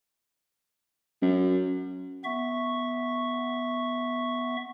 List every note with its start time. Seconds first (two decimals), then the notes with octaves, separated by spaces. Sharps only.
1.22 F#2
2.24 B3 E5 C#6